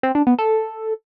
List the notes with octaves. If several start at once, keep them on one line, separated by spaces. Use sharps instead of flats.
C4
D4
B3
A4